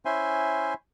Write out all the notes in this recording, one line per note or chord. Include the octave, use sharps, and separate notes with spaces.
C#4 E4 C5 E5 G#5 C6